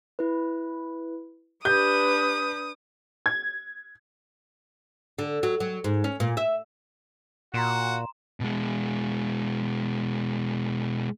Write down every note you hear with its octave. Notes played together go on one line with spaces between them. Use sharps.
E4 B4
D4 G4 B4 D#6 G6
G#6
D3
F#3
F#3
G#2
C#4
A#2
E5
A#2 F#4 A#5 C6 E7
B2 G#3